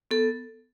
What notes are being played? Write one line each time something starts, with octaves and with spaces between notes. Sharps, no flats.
B3 A4